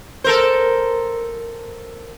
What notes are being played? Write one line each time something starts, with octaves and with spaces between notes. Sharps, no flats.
A4 A#4 C5